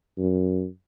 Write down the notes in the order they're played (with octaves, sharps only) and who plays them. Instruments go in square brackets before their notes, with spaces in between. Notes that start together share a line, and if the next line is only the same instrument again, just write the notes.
[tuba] F#2